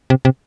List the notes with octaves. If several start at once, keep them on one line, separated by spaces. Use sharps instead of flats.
C3
C3